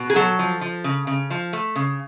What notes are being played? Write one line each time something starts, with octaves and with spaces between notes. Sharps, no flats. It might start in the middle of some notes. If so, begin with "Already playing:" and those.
Already playing: B2
G#4
F#3 A4
F3
F3
C#3
C#3
F3
A3
C#3